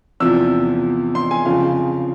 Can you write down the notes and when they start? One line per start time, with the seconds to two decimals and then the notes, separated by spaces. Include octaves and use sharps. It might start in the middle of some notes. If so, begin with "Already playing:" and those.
0.20 E2 C3 F3 E6
1.15 C6
1.31 G#5
1.45 F2 C#3 F3 F5